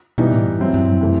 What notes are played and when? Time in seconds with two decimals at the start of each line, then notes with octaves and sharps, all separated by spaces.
0.18 B2 E3 G3 B3 D#4
0.32 A2
0.45 G2
0.60 F#3 C4 E4
0.74 G2
0.87 F#2
1.01 C3 E3 A3 E4